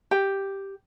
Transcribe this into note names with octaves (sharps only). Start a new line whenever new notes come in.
G4 G5